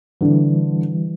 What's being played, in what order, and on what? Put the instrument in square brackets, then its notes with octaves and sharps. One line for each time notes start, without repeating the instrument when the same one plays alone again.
[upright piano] D3 [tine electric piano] E3 G3